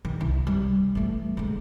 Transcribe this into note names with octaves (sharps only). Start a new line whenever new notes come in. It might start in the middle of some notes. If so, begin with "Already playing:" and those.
D#3
C2 E4
G3
E3 A3
D3 G#3